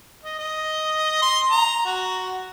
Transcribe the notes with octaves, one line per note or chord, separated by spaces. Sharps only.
D#5
D#5
C6
A#5
F#4